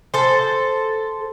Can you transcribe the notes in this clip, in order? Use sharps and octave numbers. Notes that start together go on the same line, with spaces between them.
A4 C5